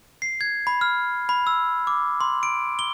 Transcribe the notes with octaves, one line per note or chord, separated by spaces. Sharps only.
C7
G#6
B5
F6
B5
E6
D6
C6
D7
G7